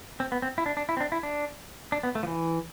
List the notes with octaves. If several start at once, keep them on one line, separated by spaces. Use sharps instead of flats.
C4
B3
C4
E4
D4
D4
E4
C4
D4
E4
D4
D4
B3
A3
F3
E3